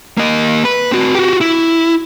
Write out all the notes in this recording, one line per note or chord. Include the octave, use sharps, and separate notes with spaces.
A#3 D#5
B4
C4 F#4
F#4 G4
E4